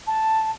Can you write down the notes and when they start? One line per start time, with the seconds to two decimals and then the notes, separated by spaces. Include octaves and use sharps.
0.07 A5